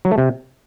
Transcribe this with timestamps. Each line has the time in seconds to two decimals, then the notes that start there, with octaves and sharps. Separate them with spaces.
0.05 F#3
0.11 A3
0.18 C3